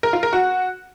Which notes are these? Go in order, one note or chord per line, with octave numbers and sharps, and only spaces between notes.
A#4
F4
A#4
F#4